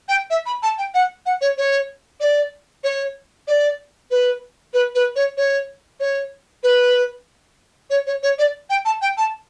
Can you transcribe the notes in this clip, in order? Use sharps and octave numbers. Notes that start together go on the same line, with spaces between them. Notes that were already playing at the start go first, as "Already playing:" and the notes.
G5
E5
B5
A5
G5
F#5
F#5
C#5
C#5
D5
C#5
D5
B4
B4
B4
C#5
C#5
C#5
B4
C#5
C#5
C#5
D5
G5
A5
G5
A5